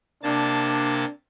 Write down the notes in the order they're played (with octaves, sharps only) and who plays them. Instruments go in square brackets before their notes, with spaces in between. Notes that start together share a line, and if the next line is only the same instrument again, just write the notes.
[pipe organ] C3 A#3 A5 [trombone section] D4